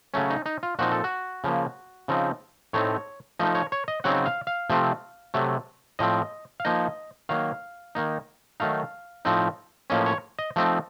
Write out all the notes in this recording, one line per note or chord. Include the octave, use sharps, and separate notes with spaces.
C#3 F#3 A3 C#4
D#4
D#4
F4
A#2 F3 C4 D#4 F#4
A4
F#4
C#3 F3 A#3
C#3 F3 C4 D#4
A2 A3 C4 D#4 C#5
F3 A3 D#4 D#5
C#5
C#5
D#5
C#3 F#3 C4 D#4 F#5
F5
F5
C3 F3 A3 C4
C3 F#3 A3
A2 F3 C4 D#5
F5
F3 A#3 D#4 D#5
D#3 F#3 A#3 F5
D#3 A#3 D#4
D#3 F#3 A3 D#4 F5
A2 F3 C4 D#4
A2 F3 A#3 C#4 D#5
C#5
D#5
F3 A3 C4 D#4